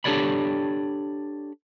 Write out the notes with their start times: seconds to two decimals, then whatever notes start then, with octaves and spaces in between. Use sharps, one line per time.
0.04 D4 G4 A4 C#5 D5 B5